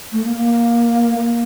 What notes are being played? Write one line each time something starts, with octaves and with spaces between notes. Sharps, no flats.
A3
A#3
A#3
A#3